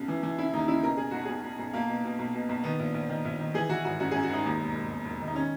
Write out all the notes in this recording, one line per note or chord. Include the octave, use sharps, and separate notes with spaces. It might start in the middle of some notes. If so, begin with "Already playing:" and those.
Already playing: B1 C#3
E3
E3
C#3 E4
D#2 D#4
C#3 E4
B2 A#4
B2 G#4
B1 F#4
B1 G#4
B1
B1
B1 A#3
B2
B2
B1
B2
B1
D#3 B3
A#1
A#1
D#3
A#1
D#3
E3 G#4
E3 F#4
G#1 F#4
F#2 F#4
G#4
F#2
F#4
G#1 D#4
D#2
E1
E1
E1
E1
D#3
D#4
D#3 C#4